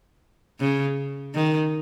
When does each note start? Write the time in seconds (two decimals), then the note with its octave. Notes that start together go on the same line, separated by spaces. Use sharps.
0.60 C#3
1.35 D#3